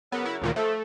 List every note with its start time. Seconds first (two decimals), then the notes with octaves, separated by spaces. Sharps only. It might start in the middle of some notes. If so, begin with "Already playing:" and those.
0.12 C#3 F#3 B3 A#4
0.25 E4
0.42 D2 A#2 D#3
0.56 F3 A3 A4